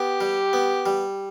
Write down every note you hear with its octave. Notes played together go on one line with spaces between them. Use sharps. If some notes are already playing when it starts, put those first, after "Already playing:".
Already playing: B3 G4
G3
B3
G3